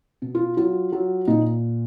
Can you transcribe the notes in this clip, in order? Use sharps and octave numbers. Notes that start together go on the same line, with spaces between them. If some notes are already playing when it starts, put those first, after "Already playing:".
B2
F4
F#3 F4
F#3
A#2 D#4